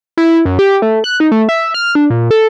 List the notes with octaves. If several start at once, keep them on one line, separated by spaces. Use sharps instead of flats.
E4
F#2
G4
A3
F#6
D#4
A3
E5
F6
D4
A#2
A4